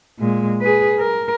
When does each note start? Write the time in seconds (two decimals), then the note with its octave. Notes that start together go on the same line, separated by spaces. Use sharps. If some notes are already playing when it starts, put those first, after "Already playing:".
0.19 A#2 G#3
0.62 G#4 B4
0.99 A#4